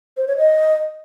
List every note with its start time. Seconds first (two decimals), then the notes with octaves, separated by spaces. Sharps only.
0.17 C5
0.27 C#5
0.38 D#5